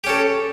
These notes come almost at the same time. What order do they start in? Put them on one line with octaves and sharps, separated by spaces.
G4 C#4 A4